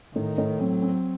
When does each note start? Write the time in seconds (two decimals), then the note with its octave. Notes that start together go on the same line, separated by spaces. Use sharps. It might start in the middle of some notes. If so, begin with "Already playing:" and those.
0.15 A2 D#3
0.38 A2
0.60 F#3 C4
0.82 C4